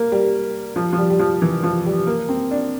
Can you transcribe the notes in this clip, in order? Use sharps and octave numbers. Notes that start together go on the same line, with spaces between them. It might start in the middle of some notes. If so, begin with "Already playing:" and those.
Already playing: A#3
G3
F3
F3
G3
G3
F3
E3
F3
G3
A#3
C4
D4